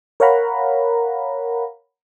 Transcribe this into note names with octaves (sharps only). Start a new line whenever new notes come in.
A#4 C#5 F5 F#5 A#5 B5